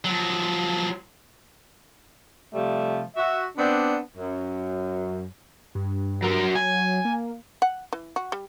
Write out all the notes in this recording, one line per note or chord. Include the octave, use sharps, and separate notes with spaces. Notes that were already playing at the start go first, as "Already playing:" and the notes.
F3 F#3
C3 F3 G3 A3
F#4 E5
B3 C4 D4
F#2
G2
F#3 A#4
F#3 G#5
A#3
F#5
E3
F#4
G3